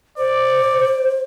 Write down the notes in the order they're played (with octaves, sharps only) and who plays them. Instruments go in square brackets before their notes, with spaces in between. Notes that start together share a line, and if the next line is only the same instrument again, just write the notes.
[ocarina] C5 [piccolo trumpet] D5